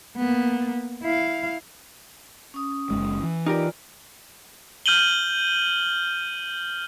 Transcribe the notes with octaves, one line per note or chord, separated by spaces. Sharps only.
A#3 B3
E4 F5
C#4 D#6
F#1 E2 G#3
E3
D#4 F4 G4 A#4 D5
F6 G6 D#7 F#7 G7